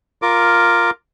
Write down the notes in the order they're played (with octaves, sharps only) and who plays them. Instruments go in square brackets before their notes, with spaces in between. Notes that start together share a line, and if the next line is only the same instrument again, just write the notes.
[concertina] F4 A#4 D6